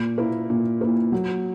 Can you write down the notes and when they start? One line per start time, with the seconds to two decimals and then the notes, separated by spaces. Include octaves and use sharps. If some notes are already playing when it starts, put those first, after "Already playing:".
Already playing: A#2
0.18 A#3 E4
0.50 A#2
0.81 A#3 E4
1.12 F#3